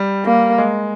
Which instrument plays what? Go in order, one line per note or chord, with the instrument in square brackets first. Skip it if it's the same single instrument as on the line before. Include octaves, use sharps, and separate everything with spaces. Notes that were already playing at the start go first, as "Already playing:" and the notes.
Already playing: [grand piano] G3
[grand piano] G3 [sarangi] A#3
[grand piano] G#3